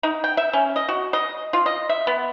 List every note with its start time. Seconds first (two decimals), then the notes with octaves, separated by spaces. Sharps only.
0.03 D#4
0.24 G5
0.37 E5
0.53 C#4
0.76 D#5
0.88 F#4
1.13 D#5
1.53 F4
1.66 D#5
1.89 E5
2.07 B3